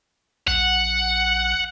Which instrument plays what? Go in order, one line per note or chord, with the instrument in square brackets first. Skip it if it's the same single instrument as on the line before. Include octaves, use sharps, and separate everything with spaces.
[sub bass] A#1 [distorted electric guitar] F#5